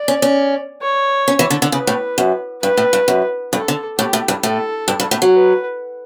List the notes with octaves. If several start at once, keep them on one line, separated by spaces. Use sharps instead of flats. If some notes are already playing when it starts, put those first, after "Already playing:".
Already playing: D5
C#4
C#4
C#5
C#4
E3
D3
D3
C#3 B4
A2
F#2
G2 B4
A2
G2
F#2
G2 A4
D3
A2 G4
A2
G2
A2 A4
G2
G2
A2
F#3
B4